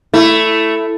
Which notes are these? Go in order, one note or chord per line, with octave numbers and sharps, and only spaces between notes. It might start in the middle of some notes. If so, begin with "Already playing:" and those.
A3 E4